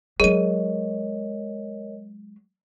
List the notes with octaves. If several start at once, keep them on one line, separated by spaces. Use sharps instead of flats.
F#3 G#3 G#4 A#4 C#5 D#5 D#7